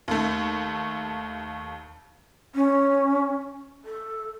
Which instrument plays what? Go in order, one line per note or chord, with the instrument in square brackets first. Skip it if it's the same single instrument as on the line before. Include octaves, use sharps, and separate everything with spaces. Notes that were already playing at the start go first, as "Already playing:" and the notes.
[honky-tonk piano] D#2 A3
[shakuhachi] C#4
A4